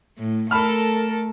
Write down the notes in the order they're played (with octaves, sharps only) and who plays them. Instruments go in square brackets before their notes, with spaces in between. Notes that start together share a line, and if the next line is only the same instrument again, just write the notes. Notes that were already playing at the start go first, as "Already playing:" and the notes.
[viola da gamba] A2
[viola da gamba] A3 A#4 [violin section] A4 [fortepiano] B5 F6